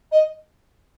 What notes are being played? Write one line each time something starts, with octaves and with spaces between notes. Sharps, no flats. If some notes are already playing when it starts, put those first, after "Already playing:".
D#5